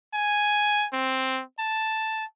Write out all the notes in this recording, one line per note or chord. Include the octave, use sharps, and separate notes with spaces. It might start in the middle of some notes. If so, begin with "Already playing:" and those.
G#5
C4
A5